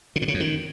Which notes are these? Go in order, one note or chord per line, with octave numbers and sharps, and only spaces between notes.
C#3
A2
C#3
F2
D#3